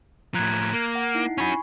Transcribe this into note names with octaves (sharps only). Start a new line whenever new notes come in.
A2 F3 A#5 F#6 G#6
A#3
F#5
D#4 E4 C7
C#4 F#4 G#5 B5 C#6